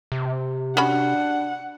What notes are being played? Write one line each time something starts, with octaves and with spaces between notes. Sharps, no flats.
C3
C#4 D4 F#4 F#5 B5